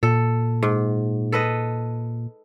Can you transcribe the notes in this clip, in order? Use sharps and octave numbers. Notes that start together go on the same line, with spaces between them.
A#2 A4
G#2
A4 B4 D#5